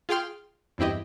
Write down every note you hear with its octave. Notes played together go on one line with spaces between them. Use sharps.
F4 G#4 F5 G5 C6 F6
E2 G2 C4 E4 G4 D#5